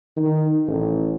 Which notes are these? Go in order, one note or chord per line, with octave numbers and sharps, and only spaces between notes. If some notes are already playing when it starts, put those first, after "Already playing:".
D#3
A1